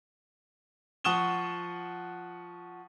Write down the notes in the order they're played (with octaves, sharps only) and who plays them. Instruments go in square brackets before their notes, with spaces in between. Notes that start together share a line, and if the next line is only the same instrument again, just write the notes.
[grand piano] F3 F#5 C#6 D#6 E7 G7